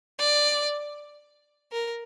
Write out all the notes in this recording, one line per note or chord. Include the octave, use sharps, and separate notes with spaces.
D5
A#4